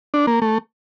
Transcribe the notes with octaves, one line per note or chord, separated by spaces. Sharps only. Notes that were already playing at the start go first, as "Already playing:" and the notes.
D4
A#3
A3